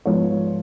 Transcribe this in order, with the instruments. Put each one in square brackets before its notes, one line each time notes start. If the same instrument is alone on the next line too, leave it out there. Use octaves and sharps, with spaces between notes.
[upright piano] G#2 F3 G#3 B3 C#5